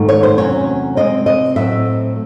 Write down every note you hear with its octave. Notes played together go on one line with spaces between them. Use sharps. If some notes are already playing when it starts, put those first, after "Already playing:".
Already playing: G#2 D#3 A3
C#5
C5
E2 C3 F#3 C#4 C#5
C3 D#3 G#3 C4 D#5
D#5
A2 F#3 A3 C4 E5